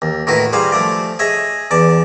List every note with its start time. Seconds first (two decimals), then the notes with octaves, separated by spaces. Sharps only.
0.02 D#2
0.27 A2 D#3 E4 F#4 B4
0.53 G3 G#4 C5 F5
0.72 F3 A3 D5
1.19 G#4 C#5 D#5 E5 G#5
1.71 E2 D5 A5